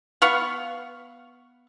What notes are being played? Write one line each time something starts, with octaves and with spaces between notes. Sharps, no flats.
B3 F5 F#5 C#6